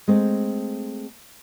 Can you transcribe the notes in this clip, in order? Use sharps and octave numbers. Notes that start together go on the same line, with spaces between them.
G#3 A3 C4